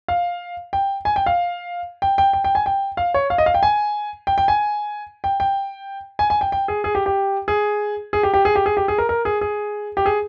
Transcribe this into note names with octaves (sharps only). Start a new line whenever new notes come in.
F5
G5
G#5
G5
F5
G5
G5
G5
G5
G#5
G5
F5
C#5
F5
D#5
F5
G5
G#5
G5
G5
G#5
G5
G5
G#5
G#5
G5
G5
G#4
G#4
G4
G4
G#4
G#4
G4
G4
G#4
G4
G#4
G4
G#4
A#4
A#4
G#4
G#4
G4
G#4